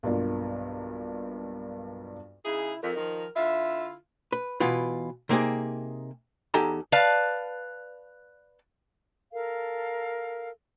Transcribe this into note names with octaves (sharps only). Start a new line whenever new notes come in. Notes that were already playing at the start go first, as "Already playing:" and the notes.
B1 G2 A#3 D4 F4
C#3 D#4 E4 G#4
F2 A#4
D#3 F3
D3 E4 F4 E5
B4
B2 E3 F4 B4
C3 A#3 D#4 G4 G#4
E2 D#4 G4 A4 G#5 A#5
B4 D5 F5 A5
A4 A#4 F5